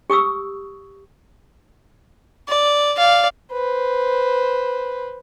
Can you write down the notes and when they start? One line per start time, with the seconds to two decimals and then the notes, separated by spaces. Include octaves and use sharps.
0.10 G4 C#6 D#6 E6
2.49 D5
2.97 D5 F5
3.52 B4 C5